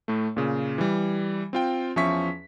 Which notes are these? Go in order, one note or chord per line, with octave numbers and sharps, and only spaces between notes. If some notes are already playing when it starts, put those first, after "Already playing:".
A2 A3
A#2 C#3
E3 G3
C4 F4 G5
E2 F3 C#4 E5 C#6 B6